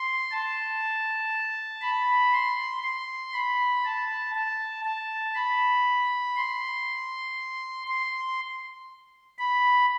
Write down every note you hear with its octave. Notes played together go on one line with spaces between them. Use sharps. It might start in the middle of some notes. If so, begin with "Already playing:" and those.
Already playing: C6
A5
B5
C6
C6
B5
A5
A5
A5
B5
C6
C6
B5